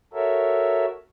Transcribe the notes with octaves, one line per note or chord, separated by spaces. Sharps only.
F#4 A4 A#4 C#5 E5